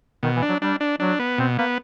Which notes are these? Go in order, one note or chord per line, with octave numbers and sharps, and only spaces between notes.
B2 D#3
E3
D4
F#3
G3 D4
D4
F#3 D4
B3
B2 C4
A#3 B3